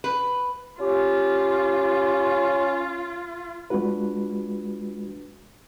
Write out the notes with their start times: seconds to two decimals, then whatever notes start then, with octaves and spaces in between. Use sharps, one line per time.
0.04 B4
0.81 C#4 F4 G4
3.70 G#3 D4 F4 F#4 B4